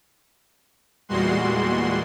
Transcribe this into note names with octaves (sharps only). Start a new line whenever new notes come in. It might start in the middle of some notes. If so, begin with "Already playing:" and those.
E2 A#2 G3 G#3 F#4 C6